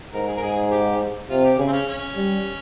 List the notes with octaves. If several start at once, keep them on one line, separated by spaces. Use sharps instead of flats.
G#2 A#4
G#4
A#4
G#2 G#4
G#4
G4
C3 F4
G4
C#3 G#4
C4
C#4
C#4
G3